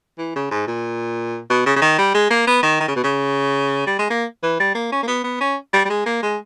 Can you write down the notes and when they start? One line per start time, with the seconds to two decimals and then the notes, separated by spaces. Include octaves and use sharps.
0.18 E3
0.36 C#3
0.51 G#2
0.67 A#2
1.50 B2
1.66 C#3
1.76 C#3
1.82 D#3
1.98 G3
2.14 G#3
2.30 A#3
2.47 B3
2.63 D#3
2.80 D#3
2.88 C#3
2.96 B2
3.04 C#3
3.87 G3
3.99 G#3
4.10 A#3
4.43 E3
4.60 G3
4.75 A#3
4.92 C#4
5.03 A#3
5.08 B3
5.24 B3
5.41 C#4
5.73 G3
5.85 G3
5.89 G#3
6.06 A#3
6.22 G#3